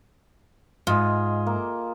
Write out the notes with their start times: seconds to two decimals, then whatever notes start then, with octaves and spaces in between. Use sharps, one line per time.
0.87 G#2 F4 G#4 D#5
1.47 A#3